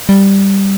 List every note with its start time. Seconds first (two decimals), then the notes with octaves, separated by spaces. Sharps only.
0.09 G3